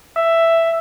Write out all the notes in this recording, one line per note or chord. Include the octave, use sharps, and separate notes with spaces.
E5